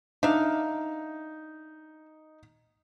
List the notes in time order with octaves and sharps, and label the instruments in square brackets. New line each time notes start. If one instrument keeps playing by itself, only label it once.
[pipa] D4 E5 F5 [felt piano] D#4